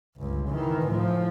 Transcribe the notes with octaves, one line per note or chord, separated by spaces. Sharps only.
G1 C#2
D#3 E3
A2 F3